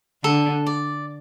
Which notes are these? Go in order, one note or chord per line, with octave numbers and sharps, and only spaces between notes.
D3 A4
D5